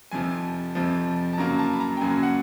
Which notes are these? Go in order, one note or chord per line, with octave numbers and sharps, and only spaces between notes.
F2 C3 F3 G#5
F2 C3 F3
A5
F#2 C#3 F#3 A#3 A#5
A5
B5
A#5
G5
F#2 C#3 F#3 A#3 G#5
F#5